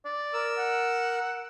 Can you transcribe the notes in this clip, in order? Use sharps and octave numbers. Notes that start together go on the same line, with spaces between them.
D5
A#4 E6
F#5